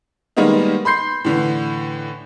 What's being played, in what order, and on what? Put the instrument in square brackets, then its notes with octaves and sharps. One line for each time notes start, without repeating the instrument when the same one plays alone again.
[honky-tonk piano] D#3 G3 G#3 A#3 B3 D#4
B5 C6 G6 C7
A2 D3 E3